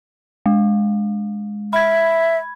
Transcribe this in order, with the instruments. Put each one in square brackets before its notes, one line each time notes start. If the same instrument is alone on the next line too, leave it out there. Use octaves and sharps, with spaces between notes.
[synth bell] G#3
[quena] E5 [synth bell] B5 G#6